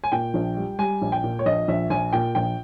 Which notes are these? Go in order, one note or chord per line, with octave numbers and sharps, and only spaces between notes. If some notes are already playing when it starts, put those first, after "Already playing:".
G#5
A#2 G5
A#1
G3
G3 G#5
A#1
G5
A#2
C#5
A#1 D#5
A#1 E5
A#1 G#5
A#2 G5
A#1 G5